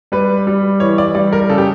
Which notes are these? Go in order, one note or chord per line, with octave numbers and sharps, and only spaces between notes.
G3 B4
G3
E3 C#5
D5
G3 D5
A#4
C#3 A4
G4